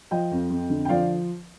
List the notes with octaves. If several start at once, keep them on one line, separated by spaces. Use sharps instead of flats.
F3 D#5 G5
F2
F2
D3
G5
F3 D5 F5